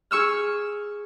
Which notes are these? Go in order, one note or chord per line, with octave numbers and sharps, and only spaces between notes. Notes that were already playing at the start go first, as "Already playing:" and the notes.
G#4 C#6 E6 F6